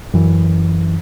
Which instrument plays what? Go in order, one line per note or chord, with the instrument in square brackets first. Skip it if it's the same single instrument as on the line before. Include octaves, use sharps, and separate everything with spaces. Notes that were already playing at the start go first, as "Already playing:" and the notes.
[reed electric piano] F#2 E3